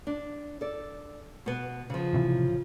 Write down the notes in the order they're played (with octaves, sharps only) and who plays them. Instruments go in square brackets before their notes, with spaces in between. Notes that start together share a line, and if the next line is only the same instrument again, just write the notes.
[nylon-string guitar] D4
A4 D5
B2 B3
C#3 F3
[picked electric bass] A1 C3 E3